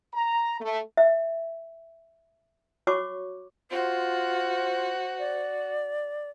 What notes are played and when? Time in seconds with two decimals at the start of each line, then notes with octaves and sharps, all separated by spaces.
0.14 A#5
0.60 A3
0.97 E5
2.87 F#4 C#5 C#6 D6
3.71 F4 F#4 C5
5.19 D5